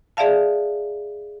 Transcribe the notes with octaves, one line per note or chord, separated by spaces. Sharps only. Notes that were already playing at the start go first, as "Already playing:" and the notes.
G#4 D5 E5 F5 A5